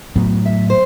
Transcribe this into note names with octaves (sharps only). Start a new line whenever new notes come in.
A2 F#3 B3
E5
C5